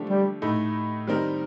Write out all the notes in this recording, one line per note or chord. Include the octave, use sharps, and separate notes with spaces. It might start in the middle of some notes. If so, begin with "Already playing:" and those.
Already playing: D3 F3 A3 D4 G4
G3
A2 A3 D#4
D#3 G3 C4 D#4 A#4